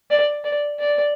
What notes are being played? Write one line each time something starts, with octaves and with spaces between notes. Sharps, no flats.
D5
D5
D5